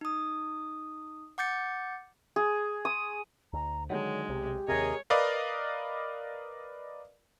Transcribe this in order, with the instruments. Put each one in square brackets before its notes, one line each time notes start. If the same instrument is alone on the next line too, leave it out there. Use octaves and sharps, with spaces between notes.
[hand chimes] D#4 D#6
F#5 D6 G6 A6 C#7
[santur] G#4
D#6
[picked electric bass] D2 [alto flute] A#5
[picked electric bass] D3 D#3 F#3 [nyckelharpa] G#3 [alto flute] C#5
[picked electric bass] B1 C3 [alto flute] G4
[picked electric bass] D#2 C3 [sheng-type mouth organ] G#4 A#4 D#5 [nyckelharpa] C#5
[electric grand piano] A#4 B4 D5 D#5 F5